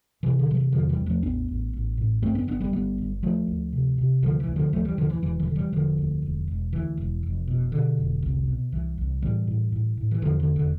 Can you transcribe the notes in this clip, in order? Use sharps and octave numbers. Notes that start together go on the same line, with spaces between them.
C3 E3
D3
C3 F3
E3
E2 D3 F3
E3 G3
E2
F3 A3
A1 B3 D4
A1
A1
A2
G2 A3 C4
B3 D4
G1 B3 D4
G3 B3
G1 G3 B3
G1
D2 F3 A3
D2
C3
C3
D2 D3 F3
E3
D2
D3 F3
D2 F3 A3
E3 G3
D2 D3 F3
E3
E1 E3
E3
D3
E3 G3
E1 D3 F3
D2
E1
E1
D2 E3
E1
F1
B2
B2 D3
F1
C2
B2
C2 E3
C2
A2 E3 G3
A2
A2
A2
E3
E2 D3 F3
D3
F1
D3